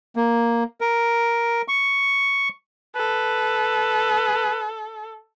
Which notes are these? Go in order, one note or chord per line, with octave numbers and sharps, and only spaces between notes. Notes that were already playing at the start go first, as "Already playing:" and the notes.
A#3
A#4
C#6
A4 B4